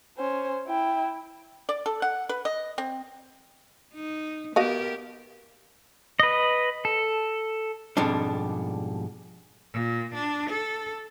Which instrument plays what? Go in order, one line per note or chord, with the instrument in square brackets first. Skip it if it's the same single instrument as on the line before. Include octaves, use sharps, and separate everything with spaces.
[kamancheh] C#4 C5
E4 G5
[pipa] D5
A4
F#5
B4
D#5
C4
[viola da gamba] D#4
[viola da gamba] B3 G4 A#4 [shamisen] F#4 D#5 F5
[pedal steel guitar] B4 D#5
A4
[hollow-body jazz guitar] F2 G#2 B2 G3 D4
[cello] A#2
D4
A4